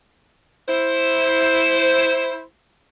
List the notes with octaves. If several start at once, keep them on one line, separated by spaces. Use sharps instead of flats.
E4 C5